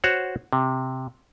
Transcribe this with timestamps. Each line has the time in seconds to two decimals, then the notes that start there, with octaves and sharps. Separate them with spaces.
0.04 F#4 C5 C#5 F#5
0.53 C3